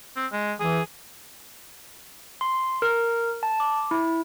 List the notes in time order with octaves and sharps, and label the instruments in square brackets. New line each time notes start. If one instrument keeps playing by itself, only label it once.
[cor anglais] C4
G#3
[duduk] E3 [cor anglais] G#4
[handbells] C6
A#4
A5
D6
E4